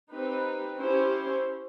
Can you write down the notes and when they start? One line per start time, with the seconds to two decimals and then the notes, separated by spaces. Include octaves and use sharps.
0.13 C4 D#4 G4 B4
0.78 C#4 E4 G4 C5